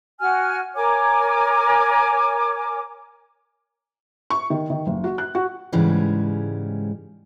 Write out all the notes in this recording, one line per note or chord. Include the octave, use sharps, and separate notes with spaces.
F#4 G#5 F6
A#4 C#5 G#5 D6
C#6
D#3
D#3
F#1
F#4
F#6
F#4
G#2 C#3 E3 G3 G#3 C#4